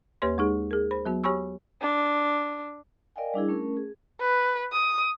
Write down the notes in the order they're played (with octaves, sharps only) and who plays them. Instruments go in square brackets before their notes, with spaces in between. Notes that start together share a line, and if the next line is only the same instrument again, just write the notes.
[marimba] D#2 A#3 G4 B4 C#5 C6
G#3 D#4 G#4
G#4 A#4
C5 B5
F#3 B3 F#4
G4 C#5 G#5 B5 C#6 E6
[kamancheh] D4
[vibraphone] A#4 D5 D#5 F5 G5 G#5
G3 D4 E4 G#4
A3 C#4 A#4
G#4
[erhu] B4
D#6